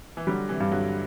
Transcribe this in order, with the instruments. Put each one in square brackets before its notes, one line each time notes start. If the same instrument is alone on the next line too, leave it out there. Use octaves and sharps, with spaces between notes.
[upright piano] E3
[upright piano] D3 F#3 [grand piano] G3
[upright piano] C3 E3
[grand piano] G2
[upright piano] D3 F#3